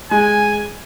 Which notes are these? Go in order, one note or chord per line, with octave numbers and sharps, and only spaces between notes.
G#3 G#5